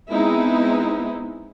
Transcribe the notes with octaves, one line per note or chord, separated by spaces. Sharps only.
G#3 B3 C4 D#4 E4